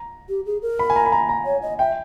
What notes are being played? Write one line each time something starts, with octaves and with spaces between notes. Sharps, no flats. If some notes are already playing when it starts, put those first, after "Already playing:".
Already playing: A#5
G4
G#4
A#4
B5
G#5
A#5
B5
A#5
A#5
C#5
D#5
E5 G5